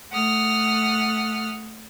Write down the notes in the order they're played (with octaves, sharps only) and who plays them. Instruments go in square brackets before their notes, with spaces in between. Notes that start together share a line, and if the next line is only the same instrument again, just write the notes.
[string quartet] A3 F#5 D#6 F6